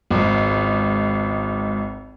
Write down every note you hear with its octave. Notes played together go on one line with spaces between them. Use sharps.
G#1 C#2